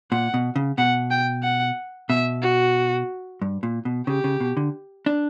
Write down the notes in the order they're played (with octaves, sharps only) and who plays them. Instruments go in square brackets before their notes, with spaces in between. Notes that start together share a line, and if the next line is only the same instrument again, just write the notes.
[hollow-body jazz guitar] A#2 [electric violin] F#5
[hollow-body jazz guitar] B2
C#3
[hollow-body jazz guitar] B2 [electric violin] F#5
[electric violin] G5
F#5
[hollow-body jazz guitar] B2 [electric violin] E5
[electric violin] F#4
[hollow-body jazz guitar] G2
A#2
B2
[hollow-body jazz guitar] C#3 [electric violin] G4
[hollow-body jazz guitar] C#3
B2
D3
D4